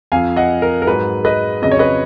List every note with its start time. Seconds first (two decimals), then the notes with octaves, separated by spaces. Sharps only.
0.12 F2 F3 F5 G#5
0.36 D#5 F#5
0.62 A#4
0.82 A#4
0.87 G#2 F#3 B4
1.25 B4 D#5
1.62 F2 C#3 F#3 D#5
1.71 C#5
1.79 B4 D#5